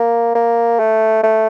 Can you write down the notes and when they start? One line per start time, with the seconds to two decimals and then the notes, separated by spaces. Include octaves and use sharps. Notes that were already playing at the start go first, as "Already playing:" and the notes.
Already playing: A#3
0.35 A#3
0.80 A3
1.23 A3